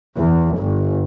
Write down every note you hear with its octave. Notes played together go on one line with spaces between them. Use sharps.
E2
G1